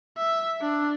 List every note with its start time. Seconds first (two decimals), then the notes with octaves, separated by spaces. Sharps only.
0.17 E5
0.62 D4